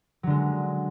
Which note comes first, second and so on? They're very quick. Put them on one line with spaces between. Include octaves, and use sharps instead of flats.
F#3 D3 G#3